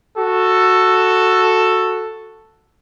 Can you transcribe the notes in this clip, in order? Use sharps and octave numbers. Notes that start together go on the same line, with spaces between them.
F#4 A4